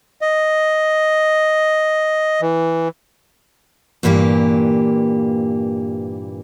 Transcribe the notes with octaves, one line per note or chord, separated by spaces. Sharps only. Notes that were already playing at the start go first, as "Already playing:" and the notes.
D#5
E3
G2 A#2 E3 A#3 G4